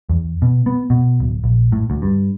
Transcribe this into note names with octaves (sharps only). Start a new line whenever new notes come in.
E2
B2
B3
B2
D1
A#1
A2
D2
G2